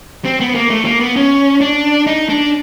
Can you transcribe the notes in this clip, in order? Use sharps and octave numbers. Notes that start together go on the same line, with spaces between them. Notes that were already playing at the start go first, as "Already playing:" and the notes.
C4
B3
A#3
A3
A#3
B3
C#4
D4
D#4
D4